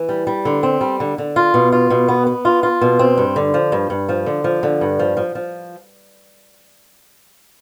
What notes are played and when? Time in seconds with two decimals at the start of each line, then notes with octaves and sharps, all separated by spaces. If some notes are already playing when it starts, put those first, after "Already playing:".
Already playing: E3
0.09 G3
0.27 G3
0.45 D3
0.63 C4
0.81 G3
1.00 D3
1.18 D3
1.36 F4
1.54 B2
1.72 F4
1.90 B2
2.08 B3
2.27 B3
2.45 F4
2.63 F4
2.81 B2
2.99 C4
3.18 G2
3.36 D3
3.54 F3
3.72 G2
3.90 G2
4.09 F3
4.26 D3
4.44 F3
4.63 D3
4.81 G2
4.99 F3
5.17 F3
5.35 F3